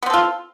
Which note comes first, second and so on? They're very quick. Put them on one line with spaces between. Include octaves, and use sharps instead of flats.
B3 C4 A4 F4